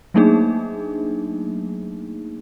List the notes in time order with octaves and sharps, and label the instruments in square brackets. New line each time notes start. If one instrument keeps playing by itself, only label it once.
[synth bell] F#3 A3 A#3 D4 D#4 G#4